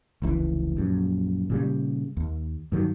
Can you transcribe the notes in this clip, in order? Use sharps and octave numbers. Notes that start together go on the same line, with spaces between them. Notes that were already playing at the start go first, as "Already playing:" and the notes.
F1 C#2 E3
A#1 F#2
A#2 C#3 G3
D#2
G2 D#3 F#3